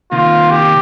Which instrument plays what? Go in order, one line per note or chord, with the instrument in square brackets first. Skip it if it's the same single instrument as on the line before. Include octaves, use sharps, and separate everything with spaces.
[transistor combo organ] C3 D#3 A#3 [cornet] F4
[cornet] G4